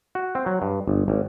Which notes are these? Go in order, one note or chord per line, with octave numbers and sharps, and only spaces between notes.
F#4
C4
F#3
G2
G1
G#1